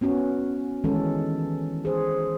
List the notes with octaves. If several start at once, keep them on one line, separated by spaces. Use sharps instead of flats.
B3 C#4 F#4
D#3 E3 G#3 C#4 A4
G#4 C5